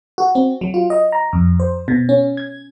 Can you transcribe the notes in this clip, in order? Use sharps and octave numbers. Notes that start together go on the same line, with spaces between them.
F#4
C4
F#3
F4
D#5
A#5
F2
C5
B2
C#4
G#6